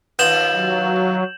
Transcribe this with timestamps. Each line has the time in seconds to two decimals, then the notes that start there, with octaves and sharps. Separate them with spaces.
0.19 D#2 B3 F4 G6 E7 F#7
0.53 F#3